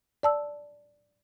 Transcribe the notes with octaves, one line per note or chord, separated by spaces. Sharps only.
D5 A5 E6